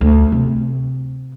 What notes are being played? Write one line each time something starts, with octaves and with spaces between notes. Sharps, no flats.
D2
C3